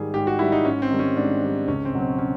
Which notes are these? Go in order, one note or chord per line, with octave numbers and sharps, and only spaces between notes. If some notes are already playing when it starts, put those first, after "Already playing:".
Already playing: G#2 D#3 G3 G#4
G#2 G4
F#4
D#3 G3 E4
D#4
G#2 C#4
C4
D#3 G3
C#4
G#2 D4
D#3 G3
C#2 C#4
C4
B2 F#3
C4
C#4